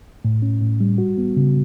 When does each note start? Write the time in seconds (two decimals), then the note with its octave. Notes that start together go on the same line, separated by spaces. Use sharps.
0.25 A2
0.42 C#4
0.61 A2
0.81 G3
0.98 F#4
1.18 B3
1.37 C#3